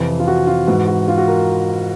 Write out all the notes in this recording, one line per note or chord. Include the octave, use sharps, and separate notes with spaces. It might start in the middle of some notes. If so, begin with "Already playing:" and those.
Already playing: F2 C3 E3
F4
F#4
F4
G#2 E3 F#4
F#4
F4
F#4
A#4